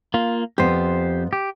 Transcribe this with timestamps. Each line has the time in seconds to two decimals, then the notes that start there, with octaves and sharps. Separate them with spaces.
0.14 A#3 F4
0.58 F2 B3 G4 C5
1.33 G4